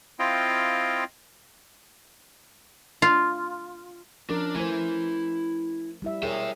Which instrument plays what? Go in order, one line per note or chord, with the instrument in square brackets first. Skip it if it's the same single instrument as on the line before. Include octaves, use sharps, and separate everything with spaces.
[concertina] C4 E4 F4 D#5 F5 G5
[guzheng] F4
[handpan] F3 C#4 A#4 [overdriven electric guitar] D4
[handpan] A3 C5 [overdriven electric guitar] E4 G#5
[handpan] G3 E4 E5
[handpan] G#4 A#4 C#5 [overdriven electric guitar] E5 G5